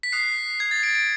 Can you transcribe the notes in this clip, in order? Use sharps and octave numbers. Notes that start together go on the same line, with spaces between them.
B6
D#6 F#6 C7
G#6
A6
D7
D7